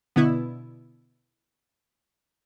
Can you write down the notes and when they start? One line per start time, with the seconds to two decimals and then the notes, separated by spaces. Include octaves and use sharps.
0.16 B2 D3 B3 E4